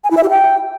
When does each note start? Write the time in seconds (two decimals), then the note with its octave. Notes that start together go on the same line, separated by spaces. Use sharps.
0.04 G#5
0.10 E4
0.17 E5
0.23 G4
0.30 G5